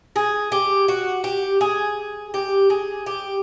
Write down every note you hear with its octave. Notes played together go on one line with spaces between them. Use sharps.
G#4
G4
F#4
G4
G#4
G4
G#4
G4